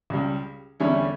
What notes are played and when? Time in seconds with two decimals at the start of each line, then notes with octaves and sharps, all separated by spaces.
0.10 C#2 C#3 G3
0.80 E2 D3 G3 C#4 E4